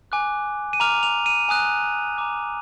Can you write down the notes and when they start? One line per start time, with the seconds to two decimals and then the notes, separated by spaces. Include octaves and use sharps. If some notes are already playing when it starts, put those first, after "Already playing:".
0.12 G#5 D6 F#6
0.73 D#7
0.80 A#5 D6 F6 F7
1.03 F7
1.26 D#7
1.49 G#5 D#6 F#6
2.17 A#5 D6 F#6